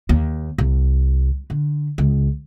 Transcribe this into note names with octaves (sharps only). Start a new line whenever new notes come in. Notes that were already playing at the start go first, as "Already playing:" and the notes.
D#2
C2
D3
C#2